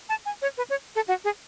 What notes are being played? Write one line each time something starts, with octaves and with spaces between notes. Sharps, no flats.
A5
G#5
C#5
B4
C#5
A4
F#4
G#4